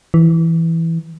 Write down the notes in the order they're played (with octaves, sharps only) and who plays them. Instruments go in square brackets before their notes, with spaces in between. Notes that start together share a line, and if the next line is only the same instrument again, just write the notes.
[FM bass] E3